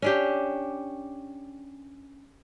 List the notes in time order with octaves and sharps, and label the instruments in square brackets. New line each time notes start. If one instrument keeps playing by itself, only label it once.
[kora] C#4 D4 G4